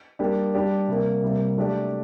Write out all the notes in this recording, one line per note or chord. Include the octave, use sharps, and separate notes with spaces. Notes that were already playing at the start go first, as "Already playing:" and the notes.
G3 A#3 D4 G4
G3 D4 G4 D5
C3 G3 A#3
C3 G3 A#3
F#3 A3 D4 G4 D5